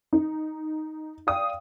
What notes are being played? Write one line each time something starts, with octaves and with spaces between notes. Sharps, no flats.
D#4
D5 F5 G5 D#6